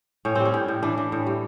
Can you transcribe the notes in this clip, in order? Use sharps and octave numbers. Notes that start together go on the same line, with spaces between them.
A2 C#4
G3 C4
C#4
A2
A2
E3 D4
E3
A2
G3